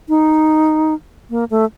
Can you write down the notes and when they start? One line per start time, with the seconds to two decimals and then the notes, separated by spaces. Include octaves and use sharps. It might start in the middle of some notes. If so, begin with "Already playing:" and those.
0.09 D#4
1.30 A#3
1.50 A3